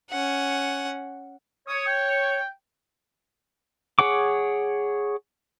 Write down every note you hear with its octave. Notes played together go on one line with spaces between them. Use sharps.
C#4 F#5
C#5 D#6
G5
G#4 C#5 F#5 D6